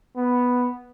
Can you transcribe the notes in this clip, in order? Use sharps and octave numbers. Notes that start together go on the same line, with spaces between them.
B3